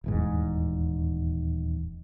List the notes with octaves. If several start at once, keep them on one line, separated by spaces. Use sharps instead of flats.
D#1 E2 G#2